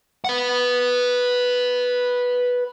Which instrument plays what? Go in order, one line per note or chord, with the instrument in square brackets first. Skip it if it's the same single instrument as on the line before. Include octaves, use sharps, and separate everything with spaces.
[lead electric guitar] B4 F#5